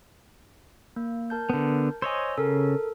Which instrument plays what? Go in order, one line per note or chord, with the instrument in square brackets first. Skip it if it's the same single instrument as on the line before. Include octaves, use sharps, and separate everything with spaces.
[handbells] A#3
A#4 A5 G6
[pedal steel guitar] D3 B3
[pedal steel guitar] C5 C#5 D#5 [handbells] G#5 E6
[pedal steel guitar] C#3 [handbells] A4 A#4